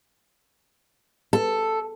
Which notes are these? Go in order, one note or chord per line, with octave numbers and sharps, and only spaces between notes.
A4